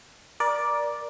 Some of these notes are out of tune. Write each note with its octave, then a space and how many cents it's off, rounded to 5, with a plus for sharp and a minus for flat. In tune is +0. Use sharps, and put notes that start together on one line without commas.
A#4 +25 D5 +0